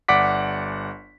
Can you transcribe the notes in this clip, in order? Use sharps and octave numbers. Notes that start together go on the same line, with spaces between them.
G1 D5 F#5 D6 B6